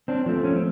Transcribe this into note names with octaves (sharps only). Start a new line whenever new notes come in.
C4 D4
F3 A3 C4
C#4
C4